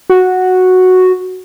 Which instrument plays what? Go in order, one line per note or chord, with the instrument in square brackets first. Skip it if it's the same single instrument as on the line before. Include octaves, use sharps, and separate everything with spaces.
[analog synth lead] F#4